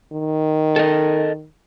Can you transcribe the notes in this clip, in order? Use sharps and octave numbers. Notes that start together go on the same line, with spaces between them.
D#3
A4 A#4 D#5